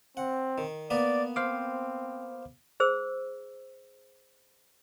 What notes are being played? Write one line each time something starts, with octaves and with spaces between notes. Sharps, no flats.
C4 F#5
D#3
A#3 B3 B4 D5
C4 C5 F5 D6
G#4 C5 E6